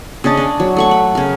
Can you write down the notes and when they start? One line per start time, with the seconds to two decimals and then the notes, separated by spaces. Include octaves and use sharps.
0.24 C#3 D4 D#5 A5
0.37 D4
0.60 F#3
0.77 A3 F#5 C#6
0.91 B5
1.15 C#3 A#4